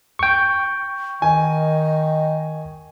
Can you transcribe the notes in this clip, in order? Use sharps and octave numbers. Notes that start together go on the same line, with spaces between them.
G5 C#6
D#3 D#5 G#5